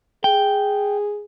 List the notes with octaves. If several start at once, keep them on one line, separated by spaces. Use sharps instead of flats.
G#4 G5